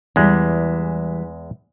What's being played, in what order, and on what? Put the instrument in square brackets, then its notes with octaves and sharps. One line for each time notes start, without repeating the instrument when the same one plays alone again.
[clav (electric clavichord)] E2 G#3 [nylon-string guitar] E3 G3